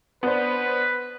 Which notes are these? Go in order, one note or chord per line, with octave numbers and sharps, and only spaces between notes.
B3 D4 B4 C5